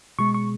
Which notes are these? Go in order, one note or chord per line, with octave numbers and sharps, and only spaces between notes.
B2 G#3 C#6
C#6